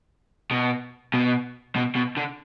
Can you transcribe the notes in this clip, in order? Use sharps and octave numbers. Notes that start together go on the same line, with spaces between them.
B2
B2
B2
B2
D3